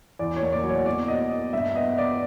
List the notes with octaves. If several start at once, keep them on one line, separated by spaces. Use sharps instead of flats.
E2 D5
C#5
A#3
D5
F#3
C#5
B2 D5
B2 D#5
B2
G2 E5
B3 D#5
B3 D5